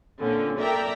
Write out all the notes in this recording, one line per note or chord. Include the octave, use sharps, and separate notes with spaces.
A#2 D3 C4 C#4
A4 A#4 D5 E5 G5 A#5